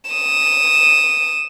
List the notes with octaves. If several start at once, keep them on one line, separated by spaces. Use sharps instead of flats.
D#6 E7